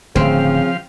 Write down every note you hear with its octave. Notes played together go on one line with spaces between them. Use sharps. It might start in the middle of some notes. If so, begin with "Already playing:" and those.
D1 D2 C#3 F3 C4 F5